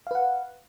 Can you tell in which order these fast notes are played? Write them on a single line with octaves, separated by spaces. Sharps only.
F5 B4 F#5